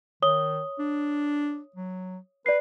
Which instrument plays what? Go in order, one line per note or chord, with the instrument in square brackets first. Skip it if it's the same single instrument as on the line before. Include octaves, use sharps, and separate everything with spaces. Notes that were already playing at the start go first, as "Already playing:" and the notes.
[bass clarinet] D#3 [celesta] C#5 D#6 G7
[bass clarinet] D4
F#3
[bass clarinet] B4 [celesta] D5 C7